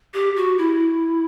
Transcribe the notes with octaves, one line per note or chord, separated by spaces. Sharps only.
G4
F#4
E4